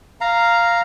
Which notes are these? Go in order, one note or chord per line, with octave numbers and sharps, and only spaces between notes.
F5 A#5